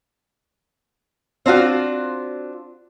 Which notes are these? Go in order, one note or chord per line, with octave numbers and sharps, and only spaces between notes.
C4 D4 F4 F#4